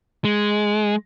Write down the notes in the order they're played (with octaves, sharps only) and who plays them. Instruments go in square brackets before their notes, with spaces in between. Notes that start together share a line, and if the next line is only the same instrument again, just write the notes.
[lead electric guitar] G#3